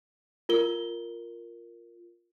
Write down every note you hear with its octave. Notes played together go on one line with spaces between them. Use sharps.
F4 A#4 G7